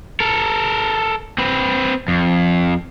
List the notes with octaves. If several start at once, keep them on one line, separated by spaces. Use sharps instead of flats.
A4 A#4
C4 B4
F2